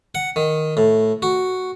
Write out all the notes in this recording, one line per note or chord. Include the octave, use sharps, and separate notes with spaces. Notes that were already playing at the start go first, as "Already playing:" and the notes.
F#5
D#3
A2
F#4